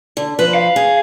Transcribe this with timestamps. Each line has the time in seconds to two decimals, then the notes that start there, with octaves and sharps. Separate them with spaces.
0.17 D3
0.39 F3 B4 C5
0.55 F5
0.76 G#4